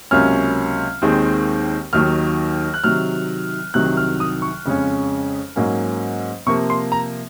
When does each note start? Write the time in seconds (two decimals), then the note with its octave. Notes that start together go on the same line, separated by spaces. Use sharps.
0.11 C#2 C3 F#3 A#3 C#4 F6
1.02 D#2 D#3 G#3 C4
1.93 D#2 D#3 F#3 F6
2.74 F#6
2.84 C3 D#3 F#3 F6
3.74 C2 C3 D#3 F#3 F#6
3.97 F6
4.20 D#6
4.42 C#6
4.65 F2 C#3 G#3 C#4
5.56 G#2 F#3 A#3 C#4
6.47 C3 F3 A#3 C#6
6.70 C6
6.92 A#5